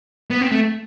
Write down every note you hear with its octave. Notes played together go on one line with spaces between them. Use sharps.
B3
C4
A3